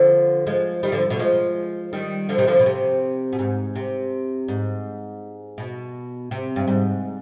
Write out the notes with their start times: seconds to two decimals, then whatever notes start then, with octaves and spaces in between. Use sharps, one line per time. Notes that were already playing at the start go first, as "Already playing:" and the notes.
Already playing: D3 F3
0.46 F3 G#3
0.83 D#3 G3
0.92 D3 F3
1.10 B2 D3
1.19 F3 G#3
1.93 D#3 G3
2.29 D3 F3
2.38 C3 D#3
2.47 D3 F3
2.59 B2
2.66 C3
3.33 B2
3.39 G#2
3.75 C3
4.48 G#2
5.58 B2
6.31 C3
6.56 G2
6.68 G#2